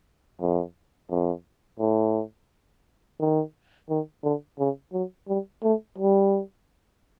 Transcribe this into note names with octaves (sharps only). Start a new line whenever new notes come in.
F2
F2
A2
D#3
D#3
D3
C#3
F#3
G3
A3
G3